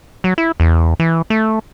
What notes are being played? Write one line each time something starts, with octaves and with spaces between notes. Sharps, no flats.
F#3
E4
E2
E3
A3